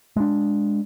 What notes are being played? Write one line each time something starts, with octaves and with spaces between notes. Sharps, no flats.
G#3 D4